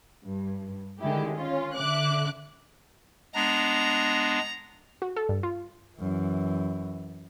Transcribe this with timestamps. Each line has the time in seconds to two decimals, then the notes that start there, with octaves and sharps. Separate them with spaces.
0.25 G2
1.01 D3 D#3 G#3 E4 G4
1.35 C#4 F4
1.77 D3 E5 D6 F#6
3.35 G#3 B3 D4 A#5
5.02 F#4
5.16 A4
5.29 G2
5.43 F4
5.98 F#2 E3